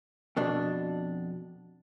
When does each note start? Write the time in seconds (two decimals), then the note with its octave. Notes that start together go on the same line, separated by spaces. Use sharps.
0.36 F2 B2 D4